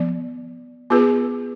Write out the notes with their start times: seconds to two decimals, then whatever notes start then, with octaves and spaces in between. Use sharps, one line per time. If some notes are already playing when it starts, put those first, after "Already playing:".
Already playing: F3 B3 D5
0.90 B3 F4 G#4 B4